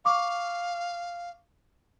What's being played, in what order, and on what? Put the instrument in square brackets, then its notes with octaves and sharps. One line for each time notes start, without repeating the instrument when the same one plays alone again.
[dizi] F5 [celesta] C#6 D6